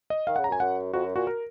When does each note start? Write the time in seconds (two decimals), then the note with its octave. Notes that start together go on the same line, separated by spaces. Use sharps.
0.10 D#5
0.27 D#3 F5
0.36 F#5
0.39 C#3
0.44 A#5
0.49 F#2
0.52 G#5
0.60 F#2 F#5
0.93 F2 F#4
1.04 F#2
1.16 A#2 F#4
1.27 A#4